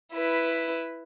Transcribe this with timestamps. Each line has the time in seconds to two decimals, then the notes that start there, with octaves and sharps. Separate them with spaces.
0.13 E4 B4